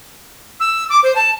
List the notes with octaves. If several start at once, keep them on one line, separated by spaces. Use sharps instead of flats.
E6
D6
C5
A5